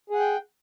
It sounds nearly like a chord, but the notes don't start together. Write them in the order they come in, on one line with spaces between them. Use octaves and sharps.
G#4 F#5 G5